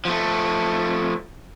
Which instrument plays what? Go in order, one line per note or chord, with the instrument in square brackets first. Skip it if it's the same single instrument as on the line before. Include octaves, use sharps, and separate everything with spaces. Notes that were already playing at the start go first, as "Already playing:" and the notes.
[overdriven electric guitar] F3 A3